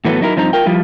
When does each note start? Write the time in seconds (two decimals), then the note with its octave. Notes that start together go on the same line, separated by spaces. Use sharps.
0.05 A2 E3 F#3 A3 B3
0.21 F#3 D#4 E4 A#4
0.36 G2 F3 C4 D#4 A#5
0.53 F4 A#4 G5
0.66 F3 G3 E4 F4